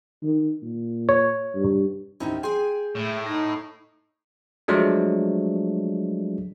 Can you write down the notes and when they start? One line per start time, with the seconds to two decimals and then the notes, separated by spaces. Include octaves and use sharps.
0.23 D#3
0.62 A#2
1.09 C#5
1.55 G2
2.20 D#2 A2 C4 C#4 D#4 E4
2.43 G#4 G5 G#5 C6
2.95 A2 A3
3.26 D#4 A#6
4.68 F3 F#3 G#3 A3 D4